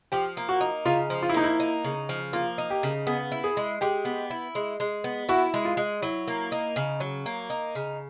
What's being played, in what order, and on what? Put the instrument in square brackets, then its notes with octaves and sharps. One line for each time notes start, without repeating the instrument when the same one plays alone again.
[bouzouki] F3 [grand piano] G4
[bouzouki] A#3
[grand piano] F#4
[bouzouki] D#4
[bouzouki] C#3 [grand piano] F4
[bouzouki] F3
[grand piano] F4
E4
[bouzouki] A#3 [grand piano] D#4
[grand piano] E4
[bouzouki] D#4
C#3
F3
[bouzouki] A#3 [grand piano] F4
[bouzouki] D#4
[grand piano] G4
[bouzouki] C#3
[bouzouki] B3 [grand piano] G#4
[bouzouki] E4
[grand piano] G#4
[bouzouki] G#3
[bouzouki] G#3 [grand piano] G4
[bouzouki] B3
E4
G#3
G#3
B3
[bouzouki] E4 [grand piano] F#4
[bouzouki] G#3
[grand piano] F4
[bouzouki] G#3
[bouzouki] F#3 [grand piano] E4
[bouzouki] A#3
D#4
C#3
F#3
A#3
D#4
C#3